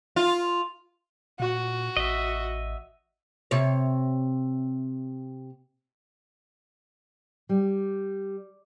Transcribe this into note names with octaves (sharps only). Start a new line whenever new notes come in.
F4
A#2 F#4
A1 D#5 E5
C3 C#5
G3